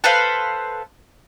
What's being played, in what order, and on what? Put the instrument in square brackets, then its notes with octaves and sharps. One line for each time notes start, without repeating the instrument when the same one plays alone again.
[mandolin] A4 B4 C5 F5